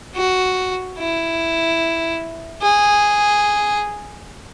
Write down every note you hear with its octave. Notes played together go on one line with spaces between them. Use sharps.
F#4
E4
G#4